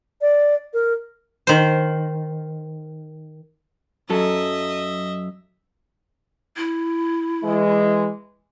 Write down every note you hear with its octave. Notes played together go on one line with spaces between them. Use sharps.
D5
A#4
D#3 C5
F#2 F#3 A4 D#5 E5
E4
E3 G#3